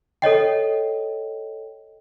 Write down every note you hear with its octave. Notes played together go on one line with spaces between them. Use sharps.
A4 C#5 D#5 G5